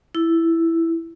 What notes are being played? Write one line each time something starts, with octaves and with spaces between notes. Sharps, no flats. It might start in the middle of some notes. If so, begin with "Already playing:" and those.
E4